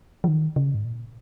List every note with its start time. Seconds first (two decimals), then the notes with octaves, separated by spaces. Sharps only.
0.24 F3
0.28 D#3
0.56 C#3
0.75 G#2
0.85 A#2